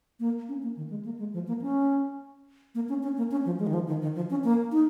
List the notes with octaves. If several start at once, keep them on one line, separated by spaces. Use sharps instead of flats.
A#3
C#4
A#3
D#3
G#3
A#3
G#3
F3
A#3
C#4
A#3
C#4
C#4
A#3
C#4
F3
G#3
D#3
F3
D#3
D#3
F3
C#4
A#3
D#4